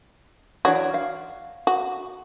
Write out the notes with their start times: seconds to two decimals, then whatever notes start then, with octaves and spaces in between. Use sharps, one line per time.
0.65 E3 D4 F#4 C#5
0.94 F5
1.67 F#4